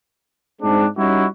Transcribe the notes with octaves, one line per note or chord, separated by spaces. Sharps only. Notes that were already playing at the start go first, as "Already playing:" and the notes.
G#2 G#3 C4 D4
G3 C#4 D#4 E4 F#4